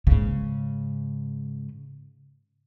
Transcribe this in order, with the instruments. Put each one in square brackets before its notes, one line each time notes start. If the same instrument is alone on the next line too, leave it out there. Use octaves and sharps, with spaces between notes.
[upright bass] G#2 C#3